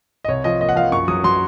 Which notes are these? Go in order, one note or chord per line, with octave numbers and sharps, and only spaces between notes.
D#5
C2 C#5
F3 D#5
A#3 D#5
F#5
F3 F5
F#2 C#6
F#3 D#6
F#3 C6